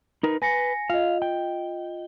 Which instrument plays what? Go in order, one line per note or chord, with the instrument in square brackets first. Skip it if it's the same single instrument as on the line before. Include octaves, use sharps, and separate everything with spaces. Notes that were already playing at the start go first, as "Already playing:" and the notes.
[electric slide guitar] D#4 A#4 B4
[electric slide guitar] B4 [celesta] G#5 A#6 C#7
[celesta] F4 D#5 [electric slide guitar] F5
[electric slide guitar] G5